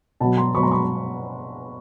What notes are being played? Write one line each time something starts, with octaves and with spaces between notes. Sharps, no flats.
B2 F#3 A5 B5
A#5 C6
B2 F#3 B5 C#6
A#5 C6
B5 C#6